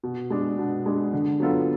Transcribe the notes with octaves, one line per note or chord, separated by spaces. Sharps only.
B2
G#3 D4
B2
G#3 D4
D3
F#3 B3 F4 A4